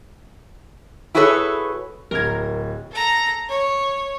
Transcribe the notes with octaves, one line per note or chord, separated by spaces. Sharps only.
E4 F#4 G#4 A4 B4 C#5
D1 A#4 G#6
A4 A#5
C#5